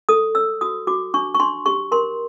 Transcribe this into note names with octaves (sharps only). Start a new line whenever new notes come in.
A4 D#6
C#5 E6
F#4 D#6
F#4 D6
D4 C#6
C#6
D4 C6
G4 C#6
A#4 C6